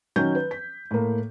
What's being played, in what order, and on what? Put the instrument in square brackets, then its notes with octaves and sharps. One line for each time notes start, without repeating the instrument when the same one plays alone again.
[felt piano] D#3 F#3 C#4 G6
B4
B6
A2 A#3